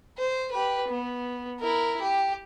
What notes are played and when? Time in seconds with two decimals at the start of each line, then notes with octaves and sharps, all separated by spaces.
0.18 C5
0.52 G4 B4
0.89 B3
1.61 E4 A#4
2.02 G4